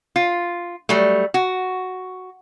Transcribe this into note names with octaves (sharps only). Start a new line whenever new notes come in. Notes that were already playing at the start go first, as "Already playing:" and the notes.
F4
F#3 G3 A3
F#4